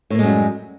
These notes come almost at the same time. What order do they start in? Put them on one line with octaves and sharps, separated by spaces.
A2 A#3 G#3 F#2 G3